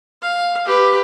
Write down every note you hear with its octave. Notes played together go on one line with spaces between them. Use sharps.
F5
G4 B4